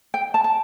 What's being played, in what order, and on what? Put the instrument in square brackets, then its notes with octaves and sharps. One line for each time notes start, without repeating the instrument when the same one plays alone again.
[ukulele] G5
A5
A5